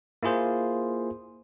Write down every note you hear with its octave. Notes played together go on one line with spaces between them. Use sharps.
A#3 E4 F4 G#4 C5